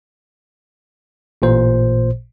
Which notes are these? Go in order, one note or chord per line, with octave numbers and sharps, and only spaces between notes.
A1 A#2 C5